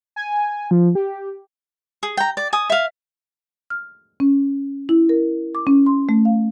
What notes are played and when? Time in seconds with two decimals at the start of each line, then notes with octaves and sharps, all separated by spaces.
0.16 G#5
0.71 F3
0.95 G4
2.03 G#4
2.17 G5 A#5
2.37 D5
2.53 G#5 D#6
2.70 E5 F5
3.70 F6
4.20 C#4
4.89 E4
5.09 A#4
5.55 D6
5.67 C#4
5.86 C6
6.09 A3
6.25 F5